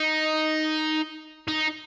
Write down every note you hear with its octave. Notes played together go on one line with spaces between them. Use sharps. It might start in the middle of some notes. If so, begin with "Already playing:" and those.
Already playing: D#4
D#4